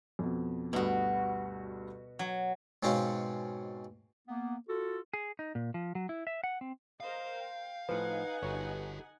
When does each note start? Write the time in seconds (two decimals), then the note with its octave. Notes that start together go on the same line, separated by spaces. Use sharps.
0.19 F2 B2
0.73 D2 G2 B2 B3 F#4
2.19 F#3
2.83 G#2 B2 C4 C#4 F5
4.26 A#3 B3
4.68 F4 F#4 A4
5.14 G#4
5.39 D#4
5.55 A#2
5.74 F3
5.95 F#3
6.09 E4
6.27 E5
6.44 F#5
6.61 C4
7.00 A#4 C5 D#5 F5
7.37 G5
7.89 A2 F3 D#4 B4 F#5 G#5
8.43 G1 F#4 G4 A4 C#5